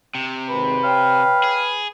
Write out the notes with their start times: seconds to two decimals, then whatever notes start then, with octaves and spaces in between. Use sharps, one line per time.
0.15 C3
0.50 G#1 B4
0.84 C#5 F5 G5
1.44 G#4